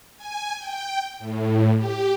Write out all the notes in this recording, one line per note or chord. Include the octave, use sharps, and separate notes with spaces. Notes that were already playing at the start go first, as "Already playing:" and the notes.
G#5
G5
A2
G4